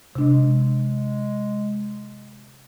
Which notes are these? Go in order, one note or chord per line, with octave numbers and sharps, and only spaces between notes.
C3 G#3 D4